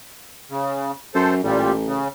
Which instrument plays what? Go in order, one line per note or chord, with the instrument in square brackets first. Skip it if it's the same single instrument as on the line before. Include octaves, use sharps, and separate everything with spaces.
[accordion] C#3
[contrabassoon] F#2 [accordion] A4 C5
[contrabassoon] A1 [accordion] A#2 G3
[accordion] C#3